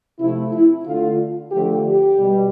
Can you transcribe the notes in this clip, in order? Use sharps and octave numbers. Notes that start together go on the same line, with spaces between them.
C3 F3 A3 E4
E4
D3 A3 F4
D3 F3 A3 G4
G4
B2 G3